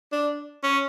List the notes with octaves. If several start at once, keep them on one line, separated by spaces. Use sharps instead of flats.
D4
C#4